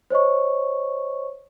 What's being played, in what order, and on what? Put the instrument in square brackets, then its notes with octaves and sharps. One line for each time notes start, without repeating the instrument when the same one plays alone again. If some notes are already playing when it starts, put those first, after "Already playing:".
[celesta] C5 C#5 D#5 C#6